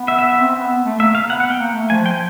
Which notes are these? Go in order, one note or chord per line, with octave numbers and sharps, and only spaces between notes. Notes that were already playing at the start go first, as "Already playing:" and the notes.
Already playing: B3
E5
E5
E5
C4
B3
A3
A#3 E5
F5
B3 F#5
F#5
G5
A#3
A3
F3 G#5
F3 G5